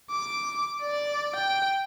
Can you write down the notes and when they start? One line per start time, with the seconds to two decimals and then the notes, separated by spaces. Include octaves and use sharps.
0.10 D6
0.82 D5
1.35 G5